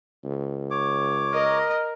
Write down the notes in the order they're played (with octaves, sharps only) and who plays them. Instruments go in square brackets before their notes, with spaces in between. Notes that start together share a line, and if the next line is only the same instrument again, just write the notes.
[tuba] C#2
[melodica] C#5 D6
[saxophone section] A#4 [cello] D#5